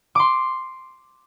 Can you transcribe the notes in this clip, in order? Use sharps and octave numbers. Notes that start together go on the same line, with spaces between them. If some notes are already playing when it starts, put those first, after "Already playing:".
C6 D6